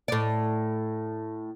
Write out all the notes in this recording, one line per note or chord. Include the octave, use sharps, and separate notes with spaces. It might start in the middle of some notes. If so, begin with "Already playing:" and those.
A2 D5